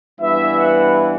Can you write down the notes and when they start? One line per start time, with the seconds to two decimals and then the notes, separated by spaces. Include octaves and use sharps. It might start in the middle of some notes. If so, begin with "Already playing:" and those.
0.20 G2 E3 B3 E5
0.56 F#5